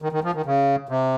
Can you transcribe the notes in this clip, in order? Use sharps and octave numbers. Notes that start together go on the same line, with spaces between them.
D#3
D#3
F3
D#3
C#3
C3